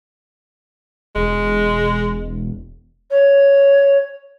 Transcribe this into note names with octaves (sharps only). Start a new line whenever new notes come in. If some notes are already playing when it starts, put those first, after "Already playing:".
E1 G#3
C#5